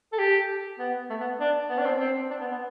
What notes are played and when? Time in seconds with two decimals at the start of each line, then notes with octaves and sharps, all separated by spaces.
0.13 A4
0.18 G4
0.79 B3
1.10 A3
1.20 B3
1.40 D4
1.70 B3
1.78 D4
1.85 C4
2.00 C4
2.30 D4
2.41 B3
2.52 B3